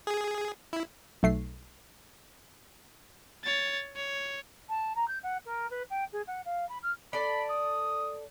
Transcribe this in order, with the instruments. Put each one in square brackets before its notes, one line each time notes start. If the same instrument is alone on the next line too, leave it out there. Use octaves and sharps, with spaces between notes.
[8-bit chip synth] G#4
E4
[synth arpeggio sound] B1 A3 C7
[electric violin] C#5 A6
C#5
[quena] A5
A#5
G6
F#5
A#4
B4
G5
G#4
F#5
F5
B5
F6
[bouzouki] A4 D5 [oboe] B5
[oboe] D#6